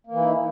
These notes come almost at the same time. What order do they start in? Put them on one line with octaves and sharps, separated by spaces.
A#3 E3 E4 D#4